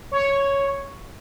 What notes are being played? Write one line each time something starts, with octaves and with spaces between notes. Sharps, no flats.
C#5